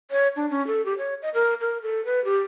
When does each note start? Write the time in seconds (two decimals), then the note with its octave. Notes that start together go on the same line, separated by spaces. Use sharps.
0.11 C#5
0.36 D4
0.50 C#4
0.67 A4
0.86 G4
0.98 C#5
1.22 D#5
1.34 A#4
1.61 A#4
1.82 A4
2.05 B4
2.25 G4